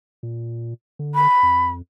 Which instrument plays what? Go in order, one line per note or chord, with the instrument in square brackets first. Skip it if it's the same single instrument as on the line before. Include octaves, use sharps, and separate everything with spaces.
[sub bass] A#2
D3
[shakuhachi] B5
[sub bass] F2